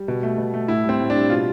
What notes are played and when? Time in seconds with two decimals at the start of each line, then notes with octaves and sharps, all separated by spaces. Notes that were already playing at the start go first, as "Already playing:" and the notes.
Already playing: G3
0.08 B2
0.23 A3
0.38 B2
0.54 A3
0.68 A2 E4
0.84 G3
0.89 C4
1.00 A2
1.10 D4
1.16 G3
1.30 B2 F4